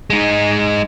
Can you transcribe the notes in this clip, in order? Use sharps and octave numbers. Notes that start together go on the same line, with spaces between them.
G#3 D#4